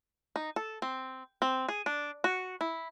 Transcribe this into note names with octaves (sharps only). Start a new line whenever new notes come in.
D#4
A4
C4
C4
G#4
D4
F#4
E4